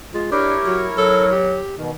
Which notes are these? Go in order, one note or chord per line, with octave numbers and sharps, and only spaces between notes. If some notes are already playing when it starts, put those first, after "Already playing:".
G#3 F4
D4 E4 G4 A#4 C#5
F#3
F#3 A4
G4
B2 D#3